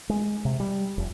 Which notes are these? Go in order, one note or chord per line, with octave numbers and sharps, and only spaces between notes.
G#3
C3
G3
F1